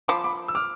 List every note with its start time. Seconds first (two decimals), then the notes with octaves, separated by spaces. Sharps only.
0.08 F3 B5 D6
0.24 B5 D6
0.48 E6
0.55 D6 F6